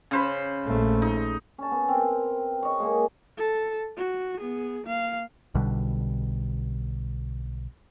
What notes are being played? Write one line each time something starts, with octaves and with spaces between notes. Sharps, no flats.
C#3 C5 B5
A#1 A3
D#4
C#4 A5
B3
C4 A#4
C#5 D#5
G#3 A#3
A4
F#4
B3 G#4
A#3 F5
B1 B2 D3 G3